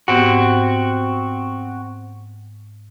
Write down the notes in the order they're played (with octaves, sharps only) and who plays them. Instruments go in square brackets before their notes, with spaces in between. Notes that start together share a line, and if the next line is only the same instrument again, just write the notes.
[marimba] G#2 B3 G4 [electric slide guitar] C4 F#4